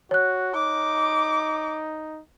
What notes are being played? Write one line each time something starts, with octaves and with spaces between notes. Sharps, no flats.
F#4 C#5 F#6
D#4 D6